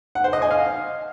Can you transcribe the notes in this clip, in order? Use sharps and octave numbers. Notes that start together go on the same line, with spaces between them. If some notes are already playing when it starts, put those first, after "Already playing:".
F#5
C5
D#5
G#5
F5